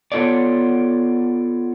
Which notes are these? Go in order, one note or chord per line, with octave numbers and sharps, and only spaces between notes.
B3 F4 A4 C#5 D5